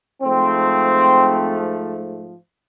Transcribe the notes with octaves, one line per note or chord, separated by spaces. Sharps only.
G#2 F3 A3 C4